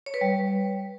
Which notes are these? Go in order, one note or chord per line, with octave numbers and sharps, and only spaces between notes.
C#5
B4
G3